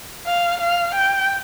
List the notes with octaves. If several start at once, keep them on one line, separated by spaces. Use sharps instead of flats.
F5
F5
G5